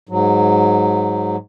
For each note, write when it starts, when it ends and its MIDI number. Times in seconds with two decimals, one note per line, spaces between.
0.09 1.36 44
0.09 1.36 54